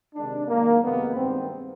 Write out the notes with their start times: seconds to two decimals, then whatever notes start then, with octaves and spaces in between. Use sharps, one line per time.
0.14 C3 D#3 G#3 D4
0.48 F#2 D#3 G#3 A#3
0.82 F2 C3 D#3 G#3 B3
1.16 G2 D#3 G#3 C4